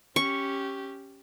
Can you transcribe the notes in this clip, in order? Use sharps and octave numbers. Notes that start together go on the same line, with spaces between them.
C#4 G4 C#6